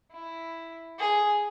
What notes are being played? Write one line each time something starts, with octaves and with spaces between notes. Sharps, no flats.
E4
G#4